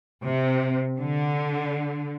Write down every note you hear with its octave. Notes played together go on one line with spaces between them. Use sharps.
C3
D3